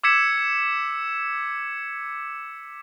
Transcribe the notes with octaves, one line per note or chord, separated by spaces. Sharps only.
D6 E6 G#6 B6 C#7 E7